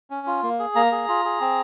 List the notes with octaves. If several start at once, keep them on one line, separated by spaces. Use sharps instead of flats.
C#4
F4
A#3
G#4
A#3 A#5
G#4
F4
G#4
C4